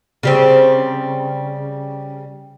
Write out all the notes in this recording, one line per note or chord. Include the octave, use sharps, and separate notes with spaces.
C#3 G3 C4